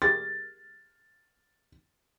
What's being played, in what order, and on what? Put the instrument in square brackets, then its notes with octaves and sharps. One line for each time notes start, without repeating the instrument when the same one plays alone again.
[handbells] G4 G#4 C6 [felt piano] A6